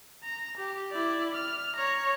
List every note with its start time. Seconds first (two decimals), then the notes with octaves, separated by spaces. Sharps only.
0.24 A#5
0.57 G4
0.91 E4 D5
1.35 F6
1.76 C#5 A#5